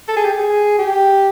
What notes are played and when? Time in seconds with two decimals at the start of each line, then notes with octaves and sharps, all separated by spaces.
0.08 A4
0.16 G#4
0.25 G4
0.32 G#4
0.78 G4